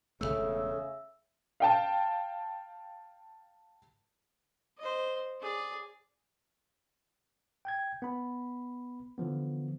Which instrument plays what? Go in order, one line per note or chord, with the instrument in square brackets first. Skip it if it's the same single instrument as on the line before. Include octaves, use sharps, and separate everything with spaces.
[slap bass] E1 E2 A3 [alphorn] C#3 [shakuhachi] A4 [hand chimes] E5 E6
[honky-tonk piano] F5 G5 A5
[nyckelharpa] C5 D#5
G#4 D5
[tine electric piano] G5 G6 G#6
B3 B5
D3 E3 F3 B3